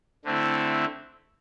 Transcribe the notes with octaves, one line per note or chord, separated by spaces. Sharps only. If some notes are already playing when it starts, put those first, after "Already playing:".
D3 A3 C4 E4